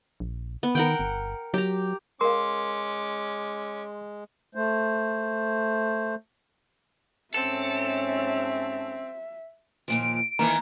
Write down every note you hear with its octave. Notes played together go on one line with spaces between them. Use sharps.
A#1
B3
D#3 A#4 F#5 G5
G1
F#3 G4 A#5
G#3 C#4 A#4 F5 C6 D6
A3 C5
G#2 C4 C#4 A4 E5
D#2 A#2 F3 D7
D#3 E3 A#3 A#5